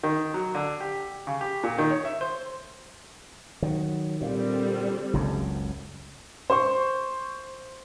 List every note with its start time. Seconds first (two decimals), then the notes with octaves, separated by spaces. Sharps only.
0.03 D#3
0.34 F#3
0.55 D3
0.80 G4
1.27 C#3
1.41 G4
1.63 A#2
1.78 D#3
1.91 C#5
2.05 E5
2.21 C5
3.62 D#3 F#3
4.21 A#2 D3 G3 C4
5.13 F#1 C#2 F#2
6.50 C5 C6 C#6